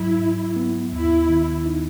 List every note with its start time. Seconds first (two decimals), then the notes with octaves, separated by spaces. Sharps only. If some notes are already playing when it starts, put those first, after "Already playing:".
Already playing: G#2 F#3 E4
0.19 G#2
0.56 B3
0.92 D#2 E4
1.29 D#3
1.66 D#4